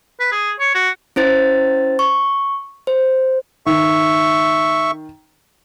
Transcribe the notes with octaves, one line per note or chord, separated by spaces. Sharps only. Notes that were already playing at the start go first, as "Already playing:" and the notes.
B4
G#4
C#5
F#4
C#4 E4 C5 A6
C#6
C5
D#3 E5 C#6